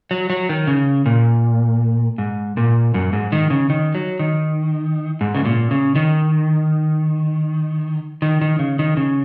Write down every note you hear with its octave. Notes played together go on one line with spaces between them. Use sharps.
F#3
F#3
D#3
C#3
A#2
G#2
A#2
F#2
G#2
D#3
C#3
D#3
F#3
D#3
G#2
C#3
A#2
C#3
D#3
D#3
D#3
C#3
D#3
C#3